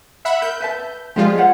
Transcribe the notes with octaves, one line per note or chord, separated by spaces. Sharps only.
E5 F#5 B5
A#4 G6
B4 E5 A5
F3 G#3 F4 G4 C5 D5
C5 C#5 F#5